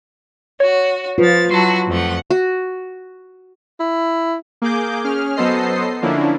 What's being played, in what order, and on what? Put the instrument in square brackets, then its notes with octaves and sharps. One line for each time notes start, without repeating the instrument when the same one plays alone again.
[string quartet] F#4 [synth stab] C#5
[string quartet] F3 A6 [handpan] F4 B4
[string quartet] F#3 E4 F#4 [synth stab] A5 C6
[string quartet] F2 A3 F#5
[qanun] F#4
[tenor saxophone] E4
[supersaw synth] A#3 G#4 D6 G6
C#4 G#4 F6
F#3 B3 A4 C5 D#5 C7
D3 F3 A#3 C#4 D4 E4